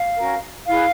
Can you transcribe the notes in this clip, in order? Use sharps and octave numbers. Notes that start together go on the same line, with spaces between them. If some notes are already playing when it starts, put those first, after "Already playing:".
Already playing: F5
C#4 F#4 A#4
E4 G#4 B4 F5